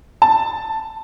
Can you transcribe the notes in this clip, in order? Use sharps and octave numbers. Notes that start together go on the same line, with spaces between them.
A5